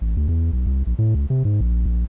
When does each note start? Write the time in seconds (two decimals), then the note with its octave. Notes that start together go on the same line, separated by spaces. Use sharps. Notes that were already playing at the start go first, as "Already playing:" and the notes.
0.01 A1
0.17 D2
0.28 E2
0.53 B1
0.66 C2
0.87 A#1
0.99 A2
1.15 C#2
1.30 C3
1.45 G#2
1.61 A#1
1.86 A#1